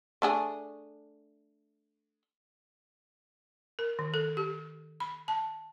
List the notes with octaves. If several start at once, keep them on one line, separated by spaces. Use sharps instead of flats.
A3 D4 G#4
A#4
D#3
A4
G4
B5
A5